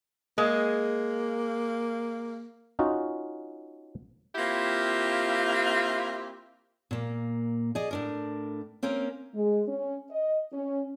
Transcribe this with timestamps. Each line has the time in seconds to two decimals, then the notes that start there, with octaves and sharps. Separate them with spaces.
0.38 G#3 A#3
2.79 C#4 D#4 F4 F#4
4.36 A#3 C4 E4 F4 G4
6.91 A#2 A#3
7.75 G#4 D5 D#5
7.91 A2 D4 A#4
8.83 A#3 C4 C#4 A#4
9.35 G#3
9.68 C#4
10.11 D#5
10.53 C#4